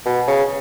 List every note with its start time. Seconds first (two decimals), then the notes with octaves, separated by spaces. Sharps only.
0.06 B2
0.28 C#3